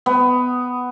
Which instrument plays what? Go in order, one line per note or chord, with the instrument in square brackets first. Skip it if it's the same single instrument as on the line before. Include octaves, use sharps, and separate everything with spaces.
[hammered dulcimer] B3